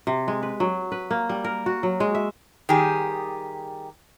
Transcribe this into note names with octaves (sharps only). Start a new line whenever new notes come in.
C3
G#3
B4
F#3
B4
A#3
G3
A#4
F#4
F#3
G#3
E5
D#3 G3 G4 G#4